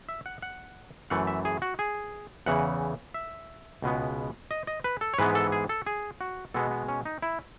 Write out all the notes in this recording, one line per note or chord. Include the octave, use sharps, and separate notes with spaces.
E5
F#5
F#5
F#2 E3 A3 F#5
E5
G#4
F#4
G#4
E2 C#3 E3 F#5
E5
C#2 B2 G#3 B3
D#5
D#5
B4
A4
C#5
G#2 E3 G#3 B3 B4
A4
G#4
A4
G#4
F#4
B2 G#3 B3 A4
B3
C#4
D#4
E4